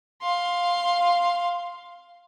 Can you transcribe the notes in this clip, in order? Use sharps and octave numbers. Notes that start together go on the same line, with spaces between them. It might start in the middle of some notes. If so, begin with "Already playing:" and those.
F5 C6